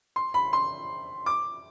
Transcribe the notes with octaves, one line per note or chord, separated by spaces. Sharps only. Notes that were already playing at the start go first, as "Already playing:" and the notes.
C6
B5
C6
D6